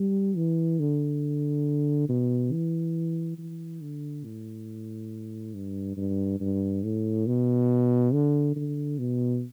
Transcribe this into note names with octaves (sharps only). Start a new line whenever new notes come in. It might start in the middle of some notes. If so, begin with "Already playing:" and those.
Already playing: G3
E3
D3
B2
E3
E3
D3
A2
G2
G2
G2
A2
B2
D3
D3
B2